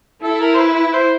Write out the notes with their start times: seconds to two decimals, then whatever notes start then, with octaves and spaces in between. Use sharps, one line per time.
0.23 E4 A4
0.41 A#4
0.54 C5
0.58 B4
0.76 B4
0.93 C5